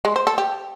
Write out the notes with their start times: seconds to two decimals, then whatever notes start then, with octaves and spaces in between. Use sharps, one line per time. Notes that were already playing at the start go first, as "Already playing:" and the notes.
0.05 G#3
0.16 C5
0.27 A4
0.38 G4